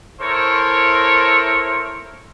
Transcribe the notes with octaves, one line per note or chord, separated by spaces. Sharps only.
E4 A4 A#4 C5 C#5